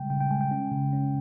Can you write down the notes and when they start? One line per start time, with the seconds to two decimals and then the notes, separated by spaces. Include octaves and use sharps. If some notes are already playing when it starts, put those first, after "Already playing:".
Already playing: C#3 G3 G#3 G5
0.10 C#3 G5
0.21 G5
0.31 G#3 G#5
0.41 G5
0.51 C#4
0.72 C#3
0.93 C#4